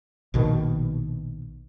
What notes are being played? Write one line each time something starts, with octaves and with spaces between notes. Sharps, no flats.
A#1 B2 D#3